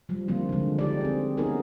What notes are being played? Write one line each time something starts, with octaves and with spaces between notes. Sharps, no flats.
F3 G3
D3 D#3 F3 A#3 C4 F4
D3 G#3
D#4 G4 D5
C4 G#4
B3 C#4 D#4 G#4 A#4